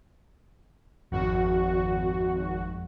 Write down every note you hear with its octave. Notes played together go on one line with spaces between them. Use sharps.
G#1 F2 F#4